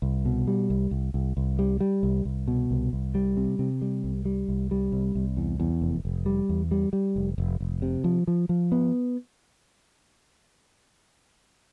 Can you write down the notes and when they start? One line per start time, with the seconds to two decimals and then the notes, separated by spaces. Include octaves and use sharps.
0.02 C2
0.25 B2
0.47 G3
0.70 C2
0.91 C2
1.14 C2
1.37 C2
1.59 G3
1.80 G3
2.03 C2
2.25 C2
2.48 B2
2.71 C2
2.93 C2
3.15 G3
3.37 C3
3.59 C3
3.82 G3
4.04 C2
4.25 G3
4.48 C2
4.71 G3
4.92 C2
5.15 C2
5.37 E2
5.60 E2
5.82 F1
6.05 F1
6.26 G3
6.49 E2
6.71 G3
6.93 G3
7.16 F1
7.38 F1
7.60 F1
7.82 C3
8.04 F3
8.27 F3
8.49 F3
8.72 B3